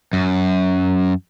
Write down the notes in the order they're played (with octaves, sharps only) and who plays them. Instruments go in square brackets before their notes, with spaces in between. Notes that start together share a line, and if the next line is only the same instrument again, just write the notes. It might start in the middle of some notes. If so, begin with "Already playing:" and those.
[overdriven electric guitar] F#2